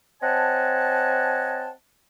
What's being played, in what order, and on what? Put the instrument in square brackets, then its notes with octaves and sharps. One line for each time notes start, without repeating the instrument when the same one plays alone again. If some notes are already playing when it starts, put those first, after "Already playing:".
[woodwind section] C4 C#5 D#5 F#5 G#5 A5